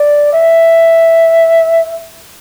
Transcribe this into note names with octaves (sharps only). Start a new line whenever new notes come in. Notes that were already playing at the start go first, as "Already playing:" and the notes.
Already playing: D5
E5